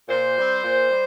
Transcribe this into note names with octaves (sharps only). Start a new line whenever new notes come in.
A#2 C5
G3 C4
A#2
G3